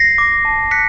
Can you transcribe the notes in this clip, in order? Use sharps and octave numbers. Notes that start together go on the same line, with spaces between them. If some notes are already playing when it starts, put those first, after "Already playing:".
Already playing: A#6 C7
D6
A5
F#6 B6 C#7